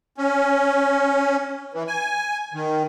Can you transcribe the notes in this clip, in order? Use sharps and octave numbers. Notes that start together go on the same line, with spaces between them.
C#4
E3
G#5
D#3